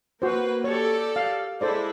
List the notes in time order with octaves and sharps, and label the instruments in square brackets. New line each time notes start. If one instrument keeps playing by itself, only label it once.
[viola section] A#3 B4 [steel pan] F#4 C5
[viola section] G4 A4 D5 [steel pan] C#5
[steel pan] F5
[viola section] G#3 E4 [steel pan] A4 C5 D5